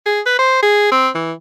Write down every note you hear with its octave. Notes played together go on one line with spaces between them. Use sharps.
G#4
B4
C5
G#4
C4
E3